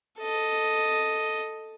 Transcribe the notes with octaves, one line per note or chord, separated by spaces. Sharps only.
A4 D#5